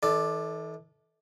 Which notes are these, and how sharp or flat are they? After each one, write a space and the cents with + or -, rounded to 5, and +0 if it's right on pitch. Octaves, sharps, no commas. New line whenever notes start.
E3 -40 A4 -10 D5 +10